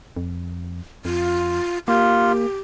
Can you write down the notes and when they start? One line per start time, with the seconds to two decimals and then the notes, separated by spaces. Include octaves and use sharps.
0.17 F2
1.05 F2 F4
1.88 A#3 F4 G4